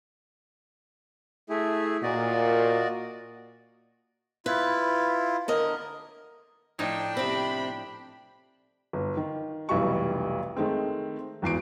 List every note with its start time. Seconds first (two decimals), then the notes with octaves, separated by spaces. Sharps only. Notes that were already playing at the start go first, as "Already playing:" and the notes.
1.49 A3 E4 G#4
2.03 A#2 F#4 D5 D#5
4.46 E4 F4 B4
5.48 D3 A#4 D#5
6.79 A2 F3 D4 D#4 G5
7.17 C3 C4 B5
8.93 G1
9.17 D#3
9.69 F1 B1 E3 G3 C#6
10.57 D#3 G#3 A3 C4
11.42 G#1 E2 C7 D7